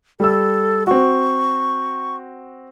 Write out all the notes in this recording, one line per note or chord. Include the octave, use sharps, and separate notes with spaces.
G3 A4 E6
C4 F#4 C#6